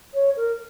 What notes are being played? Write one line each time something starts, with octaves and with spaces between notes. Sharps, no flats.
C#5
A#4